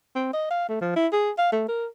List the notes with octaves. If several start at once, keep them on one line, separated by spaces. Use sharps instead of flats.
C4
D#5
F5
A3
F3
E4
G#4
F5
A3
A#4